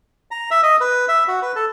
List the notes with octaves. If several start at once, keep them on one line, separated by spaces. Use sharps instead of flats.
A#5
E5
D#5
B4
E5
F#4
B4
A4